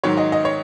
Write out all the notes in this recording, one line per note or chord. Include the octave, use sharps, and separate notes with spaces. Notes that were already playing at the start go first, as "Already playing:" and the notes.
G#2 D#3 F#3 C#5
D#5
D#5
C#5